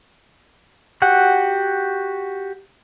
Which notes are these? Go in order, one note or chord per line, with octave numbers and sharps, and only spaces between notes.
F#4 G4 F#5